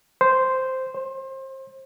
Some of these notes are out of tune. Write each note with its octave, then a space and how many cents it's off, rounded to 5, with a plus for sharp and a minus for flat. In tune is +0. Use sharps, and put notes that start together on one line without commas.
C5 -5
C5 +30